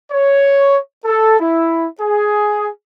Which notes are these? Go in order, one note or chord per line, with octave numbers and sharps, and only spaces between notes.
C#5
A4
E4
G#4